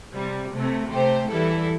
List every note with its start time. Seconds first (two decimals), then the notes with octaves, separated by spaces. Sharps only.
0.15 C3 G3
0.53 C3 A3
0.91 C3 A3 G4 C5
1.30 E2 E3 G3 E4 A4